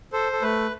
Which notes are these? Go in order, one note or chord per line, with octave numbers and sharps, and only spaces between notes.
A4 C5
A4
A3 B4